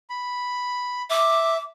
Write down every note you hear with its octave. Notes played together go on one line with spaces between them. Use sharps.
B5
E5 D6